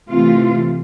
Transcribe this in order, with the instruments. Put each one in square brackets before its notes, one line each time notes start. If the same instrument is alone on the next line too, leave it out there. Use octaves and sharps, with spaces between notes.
[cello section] C3 E3 A3 C4 F4